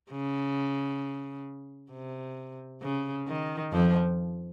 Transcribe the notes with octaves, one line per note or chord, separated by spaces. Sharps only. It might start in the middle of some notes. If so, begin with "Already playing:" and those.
C#3
C3
C#3
D#3
F2 F3